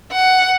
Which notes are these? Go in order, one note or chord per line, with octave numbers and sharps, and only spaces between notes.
F#5